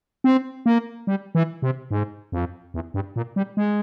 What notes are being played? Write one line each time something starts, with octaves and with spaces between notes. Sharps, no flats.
C4
A#3
G3
E3
C3
G#2
F2
E2
G2
A#2
G3
G#3